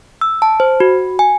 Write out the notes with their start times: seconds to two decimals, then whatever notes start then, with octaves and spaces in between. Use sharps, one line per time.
0.21 E6
0.42 A5
0.60 C5
0.80 F#4
1.19 G#5